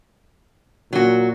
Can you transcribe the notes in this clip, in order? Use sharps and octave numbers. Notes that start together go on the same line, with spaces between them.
A#2 F#3 F#4